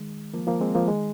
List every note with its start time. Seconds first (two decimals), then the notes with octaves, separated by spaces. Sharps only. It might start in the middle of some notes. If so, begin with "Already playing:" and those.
Already playing: D#3 G#3
0.34 F3 A#3
0.47 F3 A#3
0.60 G#3 C4
0.75 F3 A#3
0.88 D#3 G#3